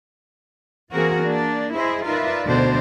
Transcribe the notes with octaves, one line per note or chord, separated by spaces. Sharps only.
E3 A#3 C4 F#4 G#4 A#4
A#3 D4
E4 G#4 C5 D#5 E5
D#4 F4 A#4 B4 D5 E5
D2 B2 D3 D4 C5